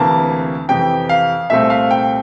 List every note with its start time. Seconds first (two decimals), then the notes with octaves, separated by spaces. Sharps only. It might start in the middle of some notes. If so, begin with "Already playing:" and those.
Already playing: D2 C3 E3 A#3 A5
0.69 F2 C3 E3 G5
1.09 F5
1.50 C2 A#2 A3 C4 E5
1.70 F5
1.91 G5